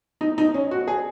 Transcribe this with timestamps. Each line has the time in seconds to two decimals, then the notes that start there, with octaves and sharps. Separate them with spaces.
0.21 D#4
0.38 D#4
0.54 C#4
0.71 F#4
0.88 G#4